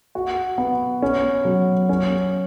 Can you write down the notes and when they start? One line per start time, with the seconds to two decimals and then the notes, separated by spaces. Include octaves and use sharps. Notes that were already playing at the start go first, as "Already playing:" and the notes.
0.15 F#4
0.58 B3
1.02 C#4
1.45 F#3
1.89 C#4